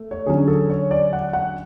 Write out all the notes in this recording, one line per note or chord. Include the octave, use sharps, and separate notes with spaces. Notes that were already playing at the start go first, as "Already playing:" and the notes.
Already playing: A3
C#5
D3 F#3 C#4 G#4
A4
C#5
D5
F#5
F#5